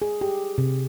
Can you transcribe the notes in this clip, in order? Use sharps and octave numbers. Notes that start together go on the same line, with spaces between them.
G#4
G4
C3